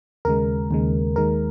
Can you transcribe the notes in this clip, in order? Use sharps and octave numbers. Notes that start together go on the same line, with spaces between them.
D#2 C#3 G#3 A#4
D#2 C#3 G#3
D#2 D#3 G#3 A#4